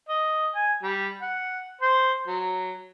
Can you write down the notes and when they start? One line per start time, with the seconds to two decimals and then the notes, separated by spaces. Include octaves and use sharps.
0.09 D#5
0.55 G#5
0.83 G3
1.22 F#5
1.81 C5
2.27 F#3